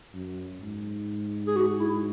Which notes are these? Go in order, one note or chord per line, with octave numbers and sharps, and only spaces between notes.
F#2
G#2
G#4
F#4
E4